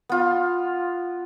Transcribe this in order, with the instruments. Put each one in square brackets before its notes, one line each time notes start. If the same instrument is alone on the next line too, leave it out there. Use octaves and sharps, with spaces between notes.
[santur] B3 F4